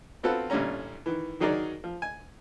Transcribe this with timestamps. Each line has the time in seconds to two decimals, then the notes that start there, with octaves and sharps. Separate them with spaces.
0.23 B3 C4 F4 F#4 A4 B4
0.50 A1 A#2 D3 G3 C#4 A#5
1.06 D#3 E3
1.40 D#3 F#3 D#4 G#4 A#4 D5
1.84 F3
2.02 G#5